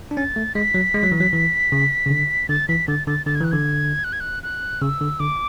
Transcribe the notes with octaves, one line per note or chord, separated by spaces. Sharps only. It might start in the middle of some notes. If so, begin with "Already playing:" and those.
D4
C#4 A6
A3
G#3 B6
F#3
G#3
F#3
E3
F#3
E3
C#3
C#3
D3
D3 A6
E3 B6
D3 A6
D3 A6
D3 A6
G#6
E3 F#6
D3 G#6
F#6
G#6
F#6
F#6
C#3 E6
D3
D3 D6